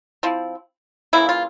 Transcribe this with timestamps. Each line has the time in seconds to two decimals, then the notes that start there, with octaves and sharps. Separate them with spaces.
0.23 F3 C4 E4
1.13 C#3 E3 A#3 E4
1.29 F4